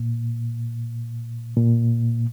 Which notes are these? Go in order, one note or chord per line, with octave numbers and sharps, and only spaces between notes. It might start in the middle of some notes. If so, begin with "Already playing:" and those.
Already playing: A#2
A#2